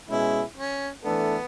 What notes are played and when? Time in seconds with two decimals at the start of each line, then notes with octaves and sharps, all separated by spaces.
0.08 B2 G#3 C#4 E4 G#4
0.56 C#4
1.04 E3 A3 B3 D4 A4